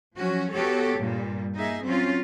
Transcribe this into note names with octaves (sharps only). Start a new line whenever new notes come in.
F3 F#3 C#4 F#4
B3 F#4 G4 A4 C#5
G2 A#2 G3
A#3 D#4 G#4 E5
F#3 C4 C#4 F4